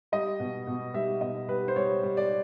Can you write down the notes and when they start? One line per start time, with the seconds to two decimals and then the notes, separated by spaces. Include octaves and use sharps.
0.12 G3 D#5
0.40 B2
0.67 B2
0.94 G3 E5
1.21 B2 D#5
1.49 G3 B4
1.68 C5
1.76 G3 C#5
2.03 G3
2.17 D5